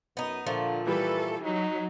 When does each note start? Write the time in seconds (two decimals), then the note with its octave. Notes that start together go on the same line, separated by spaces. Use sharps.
0.17 F#2 B3 D#4
0.46 A#2 D3 F3 A3
0.87 E3 G3 A4 B4
1.43 F#3 D#4